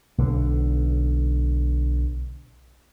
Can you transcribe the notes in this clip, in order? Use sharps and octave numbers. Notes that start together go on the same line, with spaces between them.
B1 D3